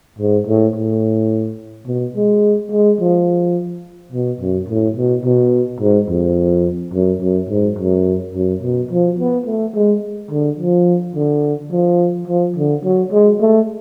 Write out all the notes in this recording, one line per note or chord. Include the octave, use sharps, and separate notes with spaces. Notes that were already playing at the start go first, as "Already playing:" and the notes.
G#2
A2
A2
B2
G#3
G#3
F3
B2
F#2
A2
B2
B2
G#2
F2
F#2
F#2
G#2
F#2
F#2
B2
F3
B3
A3
G#3
D3
F3
D3
F3
F3
D3
F#3
G#3
A3